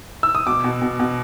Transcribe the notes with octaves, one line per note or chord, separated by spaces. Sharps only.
E6
D#6
B2 D6
B2
B2
B2